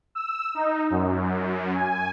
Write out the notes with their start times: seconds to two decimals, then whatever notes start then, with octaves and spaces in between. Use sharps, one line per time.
0.15 E6
0.55 D#4
0.90 F#2
1.76 G#5